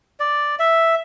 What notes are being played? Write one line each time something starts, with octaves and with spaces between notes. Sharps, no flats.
D5
E5